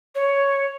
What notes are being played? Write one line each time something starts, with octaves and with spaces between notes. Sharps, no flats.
C#5